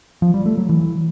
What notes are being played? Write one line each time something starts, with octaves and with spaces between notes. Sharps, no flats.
F3
G3
A3
F#3
E3